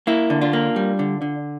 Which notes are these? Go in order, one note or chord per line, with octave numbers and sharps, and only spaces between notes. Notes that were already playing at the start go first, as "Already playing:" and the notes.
A#3 E4
D3
D4 F4
A#3
G3
D3
D3